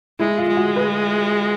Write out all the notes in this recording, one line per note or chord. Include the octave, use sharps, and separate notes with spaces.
G#3 E4
F4
G#3
F#4
B4